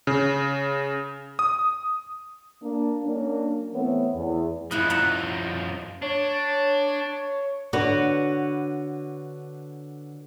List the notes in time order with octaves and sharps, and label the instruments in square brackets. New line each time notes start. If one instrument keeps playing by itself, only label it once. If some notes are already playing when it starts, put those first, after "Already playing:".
[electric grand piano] C#3
D#6
[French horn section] A#3 D4
F#3 A#3 C#4 D4
E3 A3 B3 C4 C#5
E2
[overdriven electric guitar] F#2 F3 [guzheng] E4 B4 D#5
[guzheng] E5 F#5 A#5
[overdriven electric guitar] D4 [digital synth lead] C#5
[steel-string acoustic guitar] D3 F#4 B4 C#5